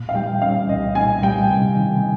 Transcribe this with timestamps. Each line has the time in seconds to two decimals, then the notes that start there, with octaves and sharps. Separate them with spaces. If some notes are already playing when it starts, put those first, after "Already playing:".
Already playing: A#2
0.09 F5
0.15 G3 G5
0.41 C#4 F5
0.68 C2 D#5
0.95 A#2 G#5
1.22 G3 G5
1.50 C3
1.76 D#3